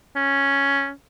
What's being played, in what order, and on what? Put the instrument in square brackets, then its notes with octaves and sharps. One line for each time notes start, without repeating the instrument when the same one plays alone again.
[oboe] C#4